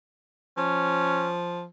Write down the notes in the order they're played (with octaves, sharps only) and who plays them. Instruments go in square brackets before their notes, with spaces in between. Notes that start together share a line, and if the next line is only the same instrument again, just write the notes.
[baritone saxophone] F3 [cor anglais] C#4